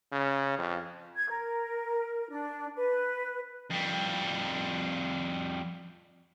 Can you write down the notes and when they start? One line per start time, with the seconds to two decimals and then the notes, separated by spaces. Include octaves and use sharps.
0.12 C#3
0.58 F2
1.16 G#6
1.29 A#4
2.29 D4
2.76 B4
3.70 F2 G3